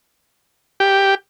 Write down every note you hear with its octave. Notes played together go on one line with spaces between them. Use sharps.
G4